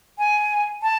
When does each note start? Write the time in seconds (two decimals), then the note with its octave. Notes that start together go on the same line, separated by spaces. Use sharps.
0.18 G#5
0.83 A5